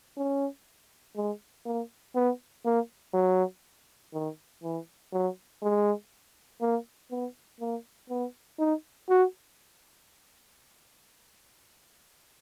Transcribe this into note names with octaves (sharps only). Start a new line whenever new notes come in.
C#4
G#3
A#3
B3
A#3
F#3
D#3
E3
F#3
G#3
A#3
B3
A#3
B3
D#4
F#4